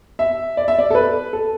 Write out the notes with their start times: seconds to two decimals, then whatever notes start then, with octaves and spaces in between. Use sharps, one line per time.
0.19 E5
0.57 D5
0.68 E5
0.79 D5
0.90 A4
0.95 B4
1.33 A4